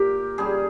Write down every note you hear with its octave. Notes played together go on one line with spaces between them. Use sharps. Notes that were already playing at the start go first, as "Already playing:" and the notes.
Already playing: A#2 G4 A#4
C#3 G3 G#4